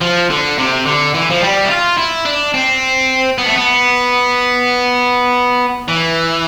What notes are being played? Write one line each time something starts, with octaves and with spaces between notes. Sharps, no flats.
F3
D3
C3
D3
E3
F3
G3
E4
F4
E4
D4
C4
B3
A3
B3
E3